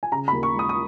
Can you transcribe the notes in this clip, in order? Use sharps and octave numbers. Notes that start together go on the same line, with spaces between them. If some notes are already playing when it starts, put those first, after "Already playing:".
G#5
C#3 A#5
B5
D#2
C#6
G#3
D#6
D#6